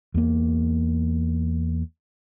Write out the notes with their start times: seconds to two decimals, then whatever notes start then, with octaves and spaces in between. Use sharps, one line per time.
0.14 E2 A#3